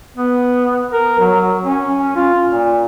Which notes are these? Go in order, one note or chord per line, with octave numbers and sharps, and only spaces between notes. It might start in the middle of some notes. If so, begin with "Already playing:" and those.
B3
A#4
F#3
C#4
F4
A#2